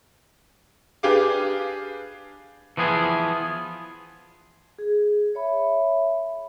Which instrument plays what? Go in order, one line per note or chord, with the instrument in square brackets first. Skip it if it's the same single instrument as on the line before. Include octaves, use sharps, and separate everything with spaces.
[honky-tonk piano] D4 G4 G#4 B4 F5 D6
[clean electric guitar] E3 F3 B3 G#4
[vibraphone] G#4
C#5 E5 B5